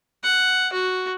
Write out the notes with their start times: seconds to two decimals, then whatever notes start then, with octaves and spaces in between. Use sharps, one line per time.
0.24 F#5
0.73 F#4